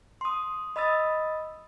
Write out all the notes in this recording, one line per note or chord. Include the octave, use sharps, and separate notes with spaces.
C6 D#6
D#5 B5 D#6 E6 A6